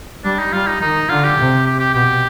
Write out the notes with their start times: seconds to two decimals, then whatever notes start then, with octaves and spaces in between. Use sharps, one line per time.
0.24 G3 D4
0.39 D#4
0.53 G3 F4
0.67 D#4
0.81 D#3 D#4
1.09 D3 F4
1.24 G4
1.38 C3
1.67 G4
1.80 G4
1.94 B2 G4